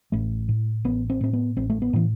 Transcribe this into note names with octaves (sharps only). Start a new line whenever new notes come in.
A1 A3
A2
A1 B3
C4
A2 C4
B3
A1 C4
A3
B3
A2 E3